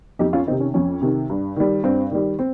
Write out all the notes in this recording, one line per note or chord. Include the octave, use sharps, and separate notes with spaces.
F2 D#4 G4
C#4 F4
C3 D#3 C4 D#4
C#4
F2 C#4
C3 D#3
G2
D#3 G3
G2 C4
D#3 G3
C4